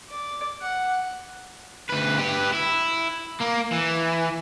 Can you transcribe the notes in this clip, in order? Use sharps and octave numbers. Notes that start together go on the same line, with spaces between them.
D5
F#5
D2 B4
G4 B4
E4
A#3
E3